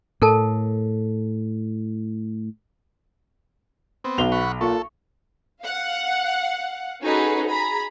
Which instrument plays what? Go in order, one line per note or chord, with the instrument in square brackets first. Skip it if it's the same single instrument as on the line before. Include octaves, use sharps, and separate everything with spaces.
[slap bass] A2 [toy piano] A4 A#4 A5
[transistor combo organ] B3 C4
[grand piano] B1 F7 G7 [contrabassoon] B2
[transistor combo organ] F#5 B5 C#6
[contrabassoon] A#2 [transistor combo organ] A4 [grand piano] C#6
[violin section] F5 F#5
C#4 D#4 F#4 G#4 A4 B4
G#4 A#5 B5